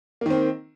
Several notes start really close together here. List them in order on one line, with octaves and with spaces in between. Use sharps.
A#3 D#3 C4